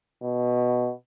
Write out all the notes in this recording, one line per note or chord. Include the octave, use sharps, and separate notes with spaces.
B2